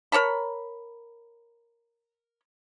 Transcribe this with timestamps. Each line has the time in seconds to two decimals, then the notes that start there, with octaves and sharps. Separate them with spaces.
0.12 A#4 C#5 A5 B5